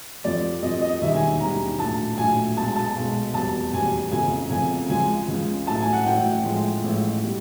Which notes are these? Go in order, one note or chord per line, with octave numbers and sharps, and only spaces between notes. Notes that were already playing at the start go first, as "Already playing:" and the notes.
F2 C3 F3 D5
F2 C3 F3 D#5
D#5
E1 D#2 D#3 G3 E5
G#5
E1 D#2 D#3 G3 A#5
A#1 A2 F#3 A5
A#1 A2 F#3 G#5
B1 B2 G#3 A5
A5
B1 B2 G#3
F1 E2 B2 G3 A5
F1 E2 B2 G3 G#5
F1 F2 C#3 G#5
F1 F2 C#3 G#5
C#2 C#3 F3 G#3 G#5
C#2 C#3 F3 G#3
A1 A2 F#3 A5
G#5
F#5
A1 A2 F#3 G5
A1 A2 F3 G#3
A1 A2 F3 G#3
B2 G3